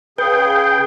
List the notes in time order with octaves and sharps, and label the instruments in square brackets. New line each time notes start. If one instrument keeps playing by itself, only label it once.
[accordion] C#3 G#4 [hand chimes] B4 [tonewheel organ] G5